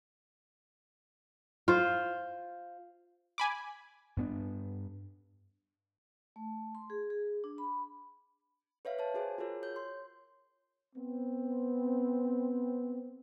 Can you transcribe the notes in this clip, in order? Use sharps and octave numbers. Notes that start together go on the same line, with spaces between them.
F4 C5
G#5 B5 D6
G2 B3 D4
A3
C6
G#4
G#4
D4
B5
B4 C#5 E5 F5
C#5 A5
F#4 G#4 C5 G#5
F4 F#4 G#4 A#4 C#5
C#5 G6
C6
B3 C4